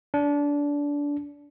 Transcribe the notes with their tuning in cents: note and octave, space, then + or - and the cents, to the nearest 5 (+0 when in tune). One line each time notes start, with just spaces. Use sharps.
D4 -25